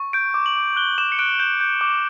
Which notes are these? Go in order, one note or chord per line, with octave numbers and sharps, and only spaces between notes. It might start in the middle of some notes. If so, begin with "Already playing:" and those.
Already playing: C#6
G6 D7
D6
F#7
D6
F#6 G7
D6 E7
C#7
F#6 D7
G6 E7
G6
D6